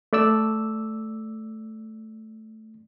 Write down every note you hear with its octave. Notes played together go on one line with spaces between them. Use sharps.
A3 D5 E6